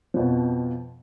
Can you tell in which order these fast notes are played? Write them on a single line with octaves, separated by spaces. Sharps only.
F3 F2 B2